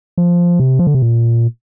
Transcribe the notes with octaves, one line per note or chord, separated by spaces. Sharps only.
F3
C3
F3
D3
C3
A#2